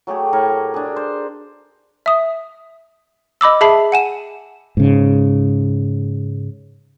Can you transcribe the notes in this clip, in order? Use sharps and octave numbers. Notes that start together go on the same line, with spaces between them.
F#3 A3 G4 G#4
A2 A#4 C#6
D4 G#4
C5
E5 D#6
D#5 B5 D6 E6
G#4 E5 A5 B5 C7
F#5 G#5 E7
G#2 C#3